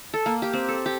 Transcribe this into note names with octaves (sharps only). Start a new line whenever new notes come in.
A4
A#3
G4
C4
A4
G4